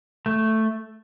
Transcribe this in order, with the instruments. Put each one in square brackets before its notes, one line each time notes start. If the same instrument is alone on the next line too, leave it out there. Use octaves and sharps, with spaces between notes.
[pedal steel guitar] A3